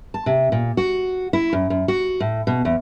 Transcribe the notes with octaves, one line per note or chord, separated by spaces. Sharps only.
A5
C3
A#2
F#4
E4
F#2
F#2
F#4
A2
B2
E2